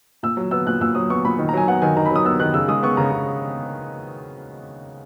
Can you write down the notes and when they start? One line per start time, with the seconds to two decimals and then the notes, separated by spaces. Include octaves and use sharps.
0.23 A#2 E6
0.37 F#3
0.51 B3 E6
0.67 A#2 F#6
0.81 A#2 E6
0.95 F#3 D#6
1.09 B3 C#6
1.25 A#2 B5
1.38 D#3
1.49 A#5
1.53 F#3 G#5
1.67 B3 F#5
1.82 D#3 G#5
1.97 D#3 A#5
2.06 B5
2.11 F#3 D#6
2.25 B3 E6
2.40 D#3 F#6
2.54 C#3 E6
2.68 G#3 D#6
2.83 B3 C#6
2.97 C#3 A#5
3.11 C#3